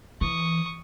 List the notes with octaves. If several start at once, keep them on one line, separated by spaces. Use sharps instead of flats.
E3 C#6 D#6